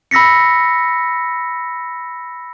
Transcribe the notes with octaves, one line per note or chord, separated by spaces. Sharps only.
B5 E6 A#6 B6 C#7